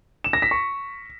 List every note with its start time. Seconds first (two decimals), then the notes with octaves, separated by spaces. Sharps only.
0.24 E7
0.33 A#6
0.42 B6
0.51 C#6